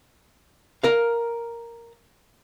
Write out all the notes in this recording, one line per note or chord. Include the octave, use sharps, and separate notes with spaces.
A#4 F5